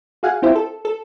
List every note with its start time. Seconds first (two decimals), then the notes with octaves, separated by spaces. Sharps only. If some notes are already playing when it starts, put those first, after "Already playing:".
0.23 F#4 G#4 F5 F#5 G#5
0.42 C4 E4 F4 G4 C5 E5
0.55 A4
0.85 A4